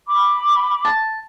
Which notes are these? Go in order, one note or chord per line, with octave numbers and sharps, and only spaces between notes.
B5 D6
A5